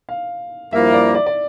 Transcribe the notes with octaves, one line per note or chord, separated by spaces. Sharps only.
F5
G2 F3 A#3 E4 E5
D5
D5
D5